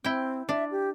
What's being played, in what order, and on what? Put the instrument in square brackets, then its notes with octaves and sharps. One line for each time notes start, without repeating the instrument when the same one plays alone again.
[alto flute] C4 [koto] E4 G5
[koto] D4 [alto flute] E5
[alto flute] G4